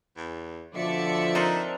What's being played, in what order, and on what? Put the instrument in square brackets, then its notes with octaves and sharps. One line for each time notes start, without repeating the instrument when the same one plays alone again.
[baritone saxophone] E2
[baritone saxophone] B2 [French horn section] D3 F3 [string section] D5 E5 C#7
[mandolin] C4 D4 A#4 [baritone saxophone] D#4